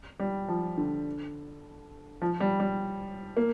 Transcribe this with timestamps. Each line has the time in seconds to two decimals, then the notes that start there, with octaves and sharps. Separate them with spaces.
0.20 G3
0.48 F3
0.78 D3
2.22 F3
2.40 G3
2.60 G3
3.37 A#3